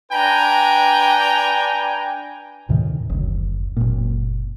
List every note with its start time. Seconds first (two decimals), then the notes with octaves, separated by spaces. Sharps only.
0.12 D4 B4 G5 G#5 A#5
2.69 D2 A2 C3 D#3
3.10 F#1 D2
3.77 F#1 A#2